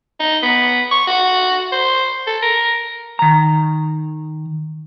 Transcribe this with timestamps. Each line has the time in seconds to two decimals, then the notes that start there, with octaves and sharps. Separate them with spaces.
0.20 D#4
0.43 B3
0.91 C#6
1.08 F#4
1.72 C5
2.27 A4
2.43 A#4
3.19 D#3 A#5